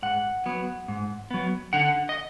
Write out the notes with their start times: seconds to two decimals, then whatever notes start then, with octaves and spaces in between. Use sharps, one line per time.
0.02 G#2 F#5
0.46 F#3 B3
0.88 G#2
1.31 F#3 B3
1.73 D3 F#5
2.09 D#5